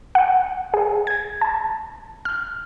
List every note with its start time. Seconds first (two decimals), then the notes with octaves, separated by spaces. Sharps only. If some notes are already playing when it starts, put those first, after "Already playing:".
0.15 F#5
0.74 G#4
1.07 G#6
1.41 A5
2.25 F6